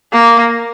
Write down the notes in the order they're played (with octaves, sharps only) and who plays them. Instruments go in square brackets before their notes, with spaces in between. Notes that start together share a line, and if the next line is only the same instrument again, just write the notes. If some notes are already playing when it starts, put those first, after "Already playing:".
[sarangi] A#3